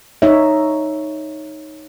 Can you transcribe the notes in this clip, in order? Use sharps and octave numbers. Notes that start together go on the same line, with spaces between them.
D#4 C#5 E5